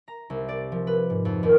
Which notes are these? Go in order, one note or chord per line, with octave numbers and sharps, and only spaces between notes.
A#5
C2
D5
F3
B4
G#2
F2
D#2